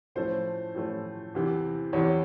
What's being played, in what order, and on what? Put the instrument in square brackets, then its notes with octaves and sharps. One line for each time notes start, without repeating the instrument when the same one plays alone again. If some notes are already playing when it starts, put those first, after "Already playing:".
[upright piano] A2 F3 A3 C#4 [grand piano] C5
[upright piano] A2 F3 A3 C#4
E2 C3 E3
[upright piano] E2 C3 E3 [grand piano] C#5